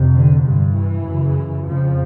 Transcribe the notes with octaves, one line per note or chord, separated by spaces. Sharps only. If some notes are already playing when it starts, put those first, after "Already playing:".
Already playing: F2 C3
D3
G2 D3
E3
F#2 C#3
F2 C#3 F3